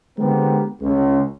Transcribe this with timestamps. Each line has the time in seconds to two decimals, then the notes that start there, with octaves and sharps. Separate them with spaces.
0.18 D3 G#3 B3 C4 G4 A#4
0.81 C#2